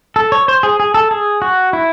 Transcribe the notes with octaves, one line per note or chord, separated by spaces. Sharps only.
A4
C#5
C5
G#4
G#4
A4
G#4
F#4
E4